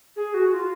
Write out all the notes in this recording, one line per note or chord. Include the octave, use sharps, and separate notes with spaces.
G#4
F#4
F4